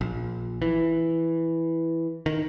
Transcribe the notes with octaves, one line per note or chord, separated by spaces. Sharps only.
A#1
E3
D#3